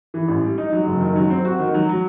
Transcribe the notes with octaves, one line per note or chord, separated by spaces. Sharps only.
E3
A1
G3
D#4
F#3
F#1
D#3
F#3
C4
F#4
D#3
F#3
F#3